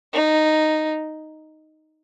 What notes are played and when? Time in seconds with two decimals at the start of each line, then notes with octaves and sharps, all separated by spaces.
0.13 D#4